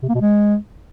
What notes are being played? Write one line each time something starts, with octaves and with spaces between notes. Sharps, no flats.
C3
A#3
B2
G#3